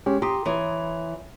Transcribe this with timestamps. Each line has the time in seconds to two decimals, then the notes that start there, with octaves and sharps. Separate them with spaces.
0.06 G#3 C#4 G4
0.22 G4 A#5 C6 D#6
0.45 E3 C#5